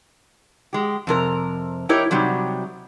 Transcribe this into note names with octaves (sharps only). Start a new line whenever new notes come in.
G#3 G4
F2 C3 A#4 A#5
E4 G4 A#4 C#5 D#5
C3 F#3 G3 D#4